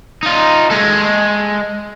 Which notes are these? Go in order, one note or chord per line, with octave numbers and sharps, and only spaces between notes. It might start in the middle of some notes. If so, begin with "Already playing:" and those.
D#4 F4
G#3 A4